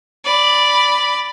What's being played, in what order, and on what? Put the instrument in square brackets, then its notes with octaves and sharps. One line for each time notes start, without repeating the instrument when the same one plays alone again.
[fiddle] D5 B5